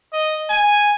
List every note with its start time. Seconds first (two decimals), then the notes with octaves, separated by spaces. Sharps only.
0.13 D#5
0.50 G#5